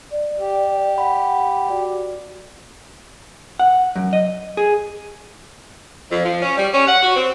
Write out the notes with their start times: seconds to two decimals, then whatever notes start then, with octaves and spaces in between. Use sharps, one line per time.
0.11 D5
0.39 G4
0.98 F#5 B5
1.70 F#4 D5
3.59 F#5
3.96 F#2
4.13 D#5
4.57 G#4
6.12 F2
6.25 F3
6.42 C#4
6.57 G3
6.74 C#4
6.87 F#5
7.02 F#4
7.15 C4